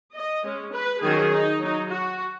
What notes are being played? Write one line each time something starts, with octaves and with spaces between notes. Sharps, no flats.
D#5
G#3 C#4
B4
D#3 F#3 C#4 G#4
D#4
F#3 D#4
F#4